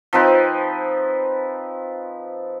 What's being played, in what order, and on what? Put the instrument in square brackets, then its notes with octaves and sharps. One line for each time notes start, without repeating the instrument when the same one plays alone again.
[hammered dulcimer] F3 C4 D#4 B4